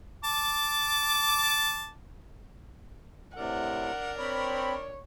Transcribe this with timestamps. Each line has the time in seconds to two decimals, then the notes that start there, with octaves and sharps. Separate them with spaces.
0.24 A5 D6
3.36 A2 C3 D4 A#4 F#5
4.19 C4 C#5 B5